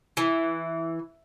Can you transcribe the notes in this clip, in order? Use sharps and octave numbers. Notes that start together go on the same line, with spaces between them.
E3